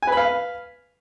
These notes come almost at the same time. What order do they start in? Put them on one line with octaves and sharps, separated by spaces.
G#5 B4 B5 F5